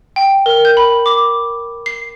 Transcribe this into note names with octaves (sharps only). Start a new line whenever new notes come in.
G5
A#4
G6
B5
D6
C7